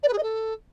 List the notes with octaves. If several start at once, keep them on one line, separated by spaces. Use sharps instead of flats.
D5
B4
G#4
D#5
A4